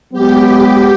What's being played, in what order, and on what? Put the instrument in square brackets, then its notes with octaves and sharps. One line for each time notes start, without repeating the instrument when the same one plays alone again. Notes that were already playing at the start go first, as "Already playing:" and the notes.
[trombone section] F#3 G#3 B3 [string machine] G4